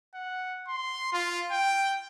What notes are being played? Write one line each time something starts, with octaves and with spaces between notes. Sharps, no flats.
F#5
C6
F4
G5